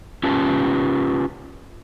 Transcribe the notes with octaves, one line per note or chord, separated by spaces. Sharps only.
C#4 F4 G4 B4 A5